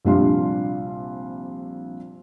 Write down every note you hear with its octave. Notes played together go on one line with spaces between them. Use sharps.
A#1 C3 G3 D4 F5 C6